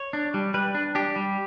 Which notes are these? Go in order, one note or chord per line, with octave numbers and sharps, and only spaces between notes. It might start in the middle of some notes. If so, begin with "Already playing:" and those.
Already playing: C#5
D4
G3
G3 B4
D4
D4 G4
G3